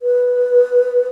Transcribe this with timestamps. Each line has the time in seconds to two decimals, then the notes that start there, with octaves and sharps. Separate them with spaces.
0.01 B4